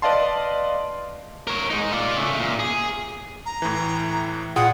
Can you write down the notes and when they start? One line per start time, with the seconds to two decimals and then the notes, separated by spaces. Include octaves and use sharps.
0.02 B4 D5 D#5 F5 A5 C6
1.47 A#4 C#5
1.70 G#3 D#4
1.93 F4 D5
2.17 C#3 A3
2.39 A#2
2.59 G#4
3.46 A#5
3.62 A2 E3
4.56 A#2 F4 G#4 F#5 G5 D#6